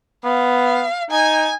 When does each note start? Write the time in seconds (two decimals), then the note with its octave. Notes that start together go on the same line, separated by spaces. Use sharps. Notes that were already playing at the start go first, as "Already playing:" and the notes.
0.25 B3 F5
1.11 D#4 G#5